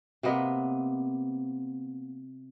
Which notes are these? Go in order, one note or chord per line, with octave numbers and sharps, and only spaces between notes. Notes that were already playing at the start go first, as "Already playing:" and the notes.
C3 A#3 B3 D#5